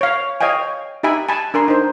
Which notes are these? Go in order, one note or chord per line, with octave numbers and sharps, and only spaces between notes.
C#5 F5
C#5 D#5 F5 G5 G#5
D#4 G4 E5 G#5 B5
G#5 A5 B5
D4 A#4 G#5 C6
D#4 C5